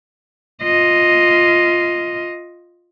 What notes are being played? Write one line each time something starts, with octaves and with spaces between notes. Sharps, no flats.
F4 D#5